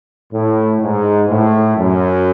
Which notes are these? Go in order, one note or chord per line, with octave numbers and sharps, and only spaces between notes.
A2
G#2
A2
F#2